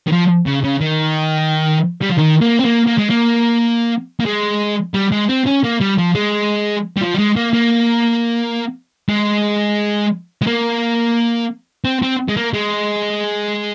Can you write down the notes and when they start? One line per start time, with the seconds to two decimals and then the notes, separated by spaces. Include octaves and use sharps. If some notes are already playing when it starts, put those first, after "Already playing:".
0.07 D#3
0.12 F3
0.46 C#3
0.64 C#3
0.81 D#3
2.02 G3
2.10 F3
2.18 D#3
2.41 A#3
2.59 C4
2.64 A#3
2.87 A#3
2.98 G#3
3.10 A#3
4.20 A#3
4.25 G#3
4.94 G3
5.12 G#3
5.29 C4
5.46 C#4
5.64 A#3
5.81 G3
5.98 F3
6.15 G#3
6.97 G3
7.01 F3
7.14 G3
7.19 G#3
7.36 A#3
7.53 A#3
9.09 G#3
10.42 G#3
10.47 A#3
11.85 C4
12.02 C4
12.28 G#3
12.36 A#3
12.53 G#3